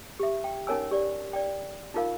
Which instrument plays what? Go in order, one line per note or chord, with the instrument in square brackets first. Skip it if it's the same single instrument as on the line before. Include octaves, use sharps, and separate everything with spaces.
[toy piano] G4 E5
G5
C#4 D#4 A#4 C#5 G#5 E6
G4 D5
D5 G5
D#4 F4 A#4 F5